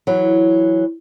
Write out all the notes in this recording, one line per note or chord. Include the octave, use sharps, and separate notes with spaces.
E3 F#3